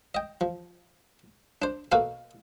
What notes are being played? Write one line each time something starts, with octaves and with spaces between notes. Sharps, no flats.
D#5 G5
F3
D4 C5
B2 A#3 F#4 A4 F5